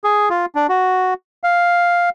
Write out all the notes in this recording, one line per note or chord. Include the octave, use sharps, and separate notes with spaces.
G#4
F4
D4
F#4
F5